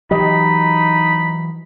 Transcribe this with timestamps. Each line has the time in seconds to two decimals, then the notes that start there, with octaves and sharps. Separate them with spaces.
0.11 E3 F#3 D#4 G4 D#5 B5